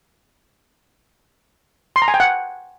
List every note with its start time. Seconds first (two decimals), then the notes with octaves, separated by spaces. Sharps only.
1.96 C6
2.02 A#5
2.08 G#5
2.14 G5
2.20 F#5